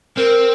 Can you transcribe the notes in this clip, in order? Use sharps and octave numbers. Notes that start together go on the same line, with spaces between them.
C4 A#4